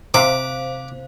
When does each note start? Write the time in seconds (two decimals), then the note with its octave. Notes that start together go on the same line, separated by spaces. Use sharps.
0.14 C3 C5 F5 D6